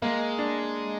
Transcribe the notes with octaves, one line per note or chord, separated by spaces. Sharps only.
G#3 A#3
D4